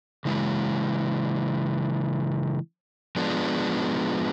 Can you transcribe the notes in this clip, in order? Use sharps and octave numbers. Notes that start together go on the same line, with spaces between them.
C#3 E3 G#3
F3 G#3 B3 D4